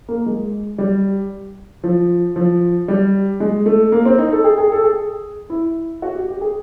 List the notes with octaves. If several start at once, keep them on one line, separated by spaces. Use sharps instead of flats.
A#3
G#3
G3
F3
F3
G3
G#3
A3
A#3
C4
D#4
A4
G#4
G#4
A4
G#4
E4
F#4
G4
G4
G#4